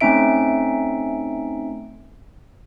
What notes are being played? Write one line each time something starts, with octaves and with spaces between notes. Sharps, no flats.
A3 C4 C#4 D#4 E5 D7